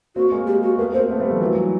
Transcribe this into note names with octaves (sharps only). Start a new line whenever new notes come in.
A#3 C4 F#4
G#3 A#3
G4
F#4
A3 B3 A#4
A#3 C4 C5
A3 B3
G3 A3
F3 G3
E3 F#3